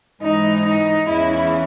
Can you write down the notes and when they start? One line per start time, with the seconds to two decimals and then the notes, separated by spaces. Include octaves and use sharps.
0.22 G#2 E3 D#4
0.66 D#4
1.08 E2 C#3 E3 E4